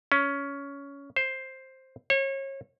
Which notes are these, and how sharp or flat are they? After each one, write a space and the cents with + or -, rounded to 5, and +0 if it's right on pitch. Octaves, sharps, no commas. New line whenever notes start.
C#4 +15
C5 +5
C#5 -30